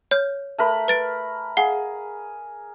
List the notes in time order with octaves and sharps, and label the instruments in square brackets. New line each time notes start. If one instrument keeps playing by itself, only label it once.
[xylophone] C#5 F6 G6
[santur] A3 A#4 B5
[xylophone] B4 A6 D7
[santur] G#4 [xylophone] F5 F#5 G7